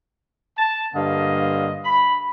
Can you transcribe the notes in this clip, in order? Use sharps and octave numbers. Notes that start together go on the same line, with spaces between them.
A5
G2 D3 A#3 D#5 F5
B5